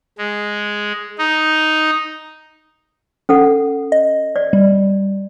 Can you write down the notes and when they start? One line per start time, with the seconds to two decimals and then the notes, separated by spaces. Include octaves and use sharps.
0.18 G#3
1.18 D#4
3.29 C#4 A4 F#5
3.92 D#5
4.36 D5
4.53 G3